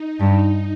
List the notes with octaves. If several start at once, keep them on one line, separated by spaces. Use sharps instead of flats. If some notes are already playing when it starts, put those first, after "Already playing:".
Already playing: D#4
G2